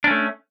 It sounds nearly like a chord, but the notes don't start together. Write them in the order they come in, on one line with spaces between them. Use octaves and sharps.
D4 C#4 A3